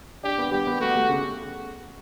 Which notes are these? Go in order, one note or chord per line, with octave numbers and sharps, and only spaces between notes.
D4 G4
B3
G3 G4
B3
A3 F#4
A3
C#3